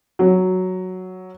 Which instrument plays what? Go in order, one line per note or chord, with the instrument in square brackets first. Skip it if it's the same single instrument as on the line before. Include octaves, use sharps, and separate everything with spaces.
[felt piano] F#3